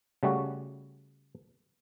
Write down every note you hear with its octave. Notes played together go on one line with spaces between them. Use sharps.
C#3 G3 A3 F#4